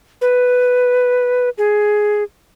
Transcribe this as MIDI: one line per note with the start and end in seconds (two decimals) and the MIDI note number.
0.21 1.50 71
1.58 2.23 68